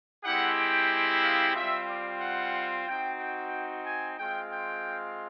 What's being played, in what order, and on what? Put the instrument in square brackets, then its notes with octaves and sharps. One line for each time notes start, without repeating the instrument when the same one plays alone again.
[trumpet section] G#3 C4 E4 G4 F#5
G5
F5
G3 C4 F4 E5
D5
F#5
C4 D#4 F#4 G5
G5
G#5
G#3 C4 F4 G5
G5